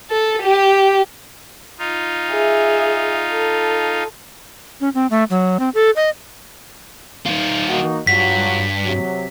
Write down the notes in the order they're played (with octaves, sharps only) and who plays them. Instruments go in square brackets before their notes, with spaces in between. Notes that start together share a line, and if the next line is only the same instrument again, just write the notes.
[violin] A4
G4
[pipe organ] D#4 F4
[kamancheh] G#4 E5
A4
[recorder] C#4
C4
A3
F#3
C4
A4
D#5
[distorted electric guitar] D#3 F4
[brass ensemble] A#3 D#4 F#4
[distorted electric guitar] G2 [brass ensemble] F#3 F4 F#4 [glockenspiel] B6
[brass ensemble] C3 F#3